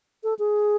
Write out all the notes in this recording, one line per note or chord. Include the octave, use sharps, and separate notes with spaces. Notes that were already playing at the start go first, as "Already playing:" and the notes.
A4
G#4